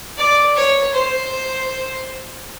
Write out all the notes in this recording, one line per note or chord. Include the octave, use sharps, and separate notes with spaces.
D5
C#5
C5